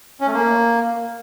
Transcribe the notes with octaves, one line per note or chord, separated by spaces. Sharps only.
C#4
A3
A#3